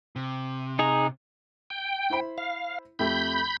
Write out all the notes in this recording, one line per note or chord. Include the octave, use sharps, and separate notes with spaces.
C3
D#4 G#4 A#5
G5
E4 C5 B5
F5
F2 A3 G4 B5 G6